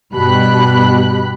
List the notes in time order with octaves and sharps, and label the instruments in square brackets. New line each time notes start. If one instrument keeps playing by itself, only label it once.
[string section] G2 B2 G4 B5 F#6